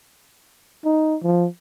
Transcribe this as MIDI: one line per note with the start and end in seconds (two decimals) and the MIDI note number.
0.85 1.16 63
1.23 1.46 53